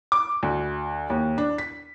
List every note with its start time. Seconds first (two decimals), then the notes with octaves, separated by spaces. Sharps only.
0.12 D6
0.43 D2
1.10 D#2
1.38 D4
1.58 B6